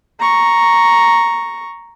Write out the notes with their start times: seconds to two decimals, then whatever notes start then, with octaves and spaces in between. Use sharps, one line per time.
0.20 A#5 C#6